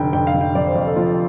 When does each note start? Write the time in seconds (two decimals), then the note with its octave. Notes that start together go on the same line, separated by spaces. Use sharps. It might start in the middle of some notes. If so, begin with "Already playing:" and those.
Already playing: F1 D3 G5
0.13 F2 G5
0.27 F5
0.34 F1
0.41 G5
0.55 F1 D5
0.66 C5
0.76 F2
0.87 A4
0.96 F3 F4